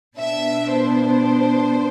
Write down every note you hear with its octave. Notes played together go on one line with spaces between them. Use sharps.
B2 B3 D4 E5
C5